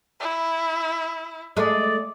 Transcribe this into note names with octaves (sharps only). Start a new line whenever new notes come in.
E4
G#3 A3 D5